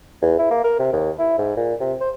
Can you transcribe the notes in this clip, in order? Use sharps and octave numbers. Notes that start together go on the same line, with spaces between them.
E2
E4
A#3
A#4
C3
D#2
E4
G#2
A#2
C3
C5